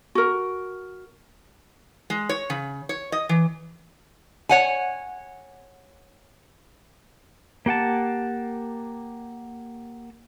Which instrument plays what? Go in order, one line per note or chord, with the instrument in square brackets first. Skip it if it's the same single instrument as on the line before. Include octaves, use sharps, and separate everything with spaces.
[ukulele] F#4 A#4
[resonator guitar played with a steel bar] G#3
C#5
C#3
C#5
D#5
E3
C#5 F#5 G#5
[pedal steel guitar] A#3 G4 F#5 A5